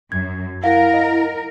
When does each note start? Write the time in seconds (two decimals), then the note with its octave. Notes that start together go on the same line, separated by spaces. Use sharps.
0.12 F#2 G#6
0.64 E4 A#4 F5 F#5
0.94 D#5